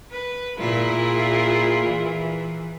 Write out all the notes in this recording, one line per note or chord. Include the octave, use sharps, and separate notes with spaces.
B4
A#2 E4 F4 G#4 A#4
E3